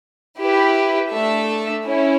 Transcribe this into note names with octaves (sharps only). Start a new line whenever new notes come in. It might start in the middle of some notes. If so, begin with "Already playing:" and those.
E4 G4 B4
A3 D4 A4 E5
C#4 E4